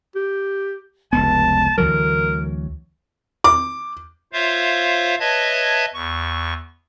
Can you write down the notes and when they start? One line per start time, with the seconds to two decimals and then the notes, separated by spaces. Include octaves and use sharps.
0.16 G4
1.13 F1 C#2 B3 A5
1.78 D2 E3 F#3 A#4
3.44 D6
4.33 F4 C5 C#5 E5 F5
5.20 B4 C#5 D#5 E5 A5 G#6
5.94 E2 C#6